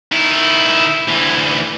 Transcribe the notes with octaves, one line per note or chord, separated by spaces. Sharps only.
D#3 E4
D2 E3